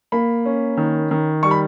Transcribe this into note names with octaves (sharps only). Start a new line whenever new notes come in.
A#3 B5
C#4
D#3
D#3
G3 C#6
B5